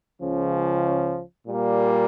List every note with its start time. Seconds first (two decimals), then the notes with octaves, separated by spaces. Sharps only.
0.20 C#2 C#3 F3 C#4
1.48 A#2 G3 A#3